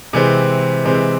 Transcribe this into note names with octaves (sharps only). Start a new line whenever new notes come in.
C3 E3 G#3 C4
C3 E3 G#3 C4